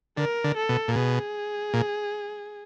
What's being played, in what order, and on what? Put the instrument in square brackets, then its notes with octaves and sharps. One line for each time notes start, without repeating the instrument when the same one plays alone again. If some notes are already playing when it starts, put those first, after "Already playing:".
[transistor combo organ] D3 [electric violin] A#4
[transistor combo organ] D3
[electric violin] A4
[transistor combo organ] B2
A#2
[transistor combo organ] B2 [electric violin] G#4
[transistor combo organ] A#2